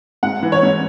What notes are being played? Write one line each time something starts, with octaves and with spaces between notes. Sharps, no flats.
G#2 F#5
E3
C#5
G#2